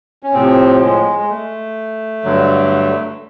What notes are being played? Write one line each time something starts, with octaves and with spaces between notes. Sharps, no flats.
C#4
A2 C3 F3 C4
G#3
G#3
A3
G2 D3 F#3